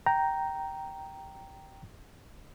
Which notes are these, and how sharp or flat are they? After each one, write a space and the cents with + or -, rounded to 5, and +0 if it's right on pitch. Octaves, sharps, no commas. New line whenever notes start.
G5 -10 A#5 +0